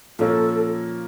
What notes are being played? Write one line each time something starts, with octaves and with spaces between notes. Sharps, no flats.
A#2 F3 A#3 C#4 A4